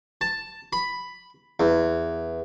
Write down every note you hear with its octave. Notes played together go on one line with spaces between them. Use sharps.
A5
B5
E2